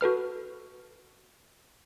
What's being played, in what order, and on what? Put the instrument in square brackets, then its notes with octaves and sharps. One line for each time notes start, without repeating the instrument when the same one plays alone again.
[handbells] F#4 A4 B4 F6